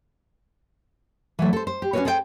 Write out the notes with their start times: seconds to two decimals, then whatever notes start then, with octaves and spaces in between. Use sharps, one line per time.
1.39 E3 F#3 A3
1.53 A4 C5
1.67 C5
1.82 G4
1.93 C#4 D4 F4 F#4 B4 C#5
2.05 G#4 A4 C5 D#5 G5 G#5